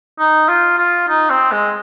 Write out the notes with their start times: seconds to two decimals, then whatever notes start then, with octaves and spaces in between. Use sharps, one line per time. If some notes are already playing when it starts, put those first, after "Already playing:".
0.19 D#4
0.48 F4
0.78 F4
1.08 D#4
1.30 C4
1.52 G#3